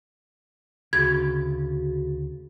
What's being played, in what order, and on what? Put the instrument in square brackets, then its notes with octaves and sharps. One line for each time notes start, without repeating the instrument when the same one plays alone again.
[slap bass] D2 C#3 [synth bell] F#4 G#4 [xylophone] G#6